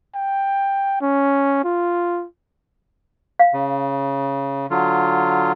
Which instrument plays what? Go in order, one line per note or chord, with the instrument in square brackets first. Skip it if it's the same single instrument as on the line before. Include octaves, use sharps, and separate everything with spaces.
[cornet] G5
C#4
F4
[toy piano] F5
[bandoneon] C#3
D3 F#3 F4